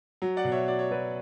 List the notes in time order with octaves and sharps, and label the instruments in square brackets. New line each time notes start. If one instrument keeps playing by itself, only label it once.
[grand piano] F#3
D5 F#5
B2
C#5 E5
F#3 D5
C#5
F#3 B4 D5